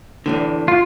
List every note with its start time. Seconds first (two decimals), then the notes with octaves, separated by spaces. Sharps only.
0.26 E2 A2 D3
0.68 F4